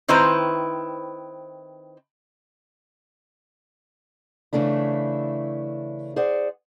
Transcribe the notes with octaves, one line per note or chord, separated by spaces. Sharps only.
D#3 C4 E4 B4 C5 A#5
C#3 E3 A3 D4 E4
G#4 C5 D5 F#5